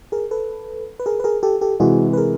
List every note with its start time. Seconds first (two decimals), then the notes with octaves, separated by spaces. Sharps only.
0.12 G#4 A#4
0.31 A4 B4
1.00 B4
1.06 G#4 A#4
1.20 B4
1.24 G#4 A#4
1.43 G4 A4
1.61 G4 A4
1.80 C3 E3 G#3 F#4 G#4
2.13 B4
2.17 G#4 A#4